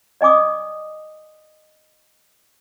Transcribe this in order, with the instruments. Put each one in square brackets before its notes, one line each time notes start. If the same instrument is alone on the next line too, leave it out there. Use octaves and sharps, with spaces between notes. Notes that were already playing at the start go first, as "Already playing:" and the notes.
[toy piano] D5 D#5 G#5 D6 D#6